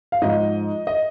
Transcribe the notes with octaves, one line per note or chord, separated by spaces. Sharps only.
F5
G#2 F3 D#5
D#5